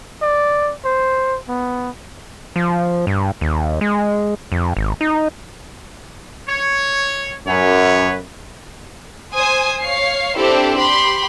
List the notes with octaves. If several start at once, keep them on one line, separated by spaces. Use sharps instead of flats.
D5
C5
B3
F3
G2
D#2
G#3
F2
G#1
D#4
C#5
F#2 B4 C#5
C5 G#5 D#6
C#5 F5 C7
C4 D4 E4 G4 A4
G4 B5 C6